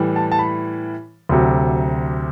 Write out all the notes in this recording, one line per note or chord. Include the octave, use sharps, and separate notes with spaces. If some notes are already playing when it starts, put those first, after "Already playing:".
Already playing: A2 E3 G3
A5
A5
B5
D2 C3 F#3